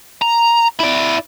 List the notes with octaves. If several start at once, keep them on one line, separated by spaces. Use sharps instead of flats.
A#5
E4 D5